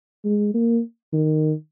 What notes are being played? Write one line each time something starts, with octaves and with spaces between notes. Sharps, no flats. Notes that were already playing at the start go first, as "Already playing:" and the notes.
G#3
A#3
D#3